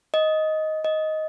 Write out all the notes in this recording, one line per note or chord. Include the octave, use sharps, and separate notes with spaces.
D#5
D#5